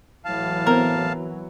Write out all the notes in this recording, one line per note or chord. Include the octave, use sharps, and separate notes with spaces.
A2 E3 F#3 F5 A5
B3 C4 A#4 C5